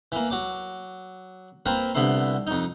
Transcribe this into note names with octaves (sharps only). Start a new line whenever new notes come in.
E3 A#3
F#3 D6
A#3 C4 F4 A#4 B4
C2 D3 B3 E4 C6
F2 D#4